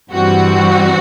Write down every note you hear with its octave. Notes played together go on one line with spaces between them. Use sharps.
G2 E3 G3 C4 F#4